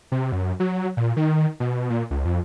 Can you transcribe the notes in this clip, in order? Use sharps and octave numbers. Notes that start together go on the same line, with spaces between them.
C3
F#2
F#3
A#2
D#3
B2
A#2
C#2
F2